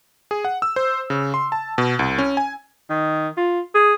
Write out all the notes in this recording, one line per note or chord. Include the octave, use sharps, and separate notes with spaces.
G#4
F#5
E6
C5
C#3
C6
A5
B2
C2
C#4
G#5
D#3
F4
G#4